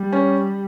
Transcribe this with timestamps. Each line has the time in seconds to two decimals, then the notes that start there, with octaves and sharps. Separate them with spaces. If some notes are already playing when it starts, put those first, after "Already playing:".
Already playing: G3
0.13 C#4